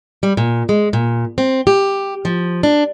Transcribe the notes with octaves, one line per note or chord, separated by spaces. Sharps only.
G3
A#2
G#3
A#2
C4
G4
F3
D4